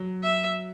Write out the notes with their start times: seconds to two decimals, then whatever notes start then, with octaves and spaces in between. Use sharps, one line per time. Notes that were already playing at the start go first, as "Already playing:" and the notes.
Already playing: F#3
0.23 E5